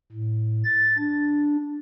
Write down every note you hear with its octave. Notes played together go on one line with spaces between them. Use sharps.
A2
A6
D4